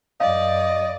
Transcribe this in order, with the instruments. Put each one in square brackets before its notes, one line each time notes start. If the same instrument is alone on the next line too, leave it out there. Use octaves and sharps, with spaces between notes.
[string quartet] F#2 D5 [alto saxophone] D#5 [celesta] F5